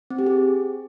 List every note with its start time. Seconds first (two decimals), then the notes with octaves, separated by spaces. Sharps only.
0.10 C4
0.18 G4
0.26 G#4